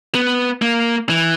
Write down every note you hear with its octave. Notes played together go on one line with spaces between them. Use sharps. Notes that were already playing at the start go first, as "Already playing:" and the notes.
B3
A#3
E3